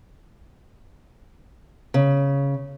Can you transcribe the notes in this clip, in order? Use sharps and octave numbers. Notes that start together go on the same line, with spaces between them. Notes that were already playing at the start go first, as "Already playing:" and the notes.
C#3